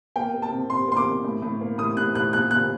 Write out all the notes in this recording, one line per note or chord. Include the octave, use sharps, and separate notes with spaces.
A#3 G5
A#3
A5
C3
C3 C6
A#3 C6
D6
C3
A2
A2
A#3
A2 D#6
A2 F#6
A2 F#6
A#2 F#6
A#2 F#6